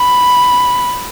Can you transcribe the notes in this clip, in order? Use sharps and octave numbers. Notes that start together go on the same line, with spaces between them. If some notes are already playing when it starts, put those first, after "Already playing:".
Already playing: B5